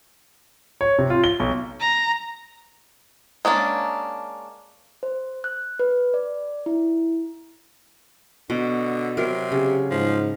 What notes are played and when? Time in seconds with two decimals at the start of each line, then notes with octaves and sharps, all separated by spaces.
0.81 C#5
0.98 C3
1.10 F4
1.24 G7
1.40 B1
1.81 A#5
3.45 G#3 A#3 C#4 D4
5.03 C5
5.44 F#6
5.79 B4
6.14 D5
6.66 E4
8.50 B2 D3
9.17 C3 F#3 A#4
9.52 C#3 G4
9.91 G#2 F3